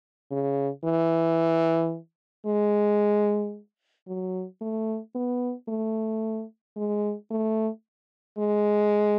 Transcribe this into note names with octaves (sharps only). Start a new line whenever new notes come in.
C#3
E3
G#3
F#3
A3
B3
A3
G#3
A3
G#3